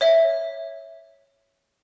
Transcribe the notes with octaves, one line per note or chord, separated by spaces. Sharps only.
C#5 E5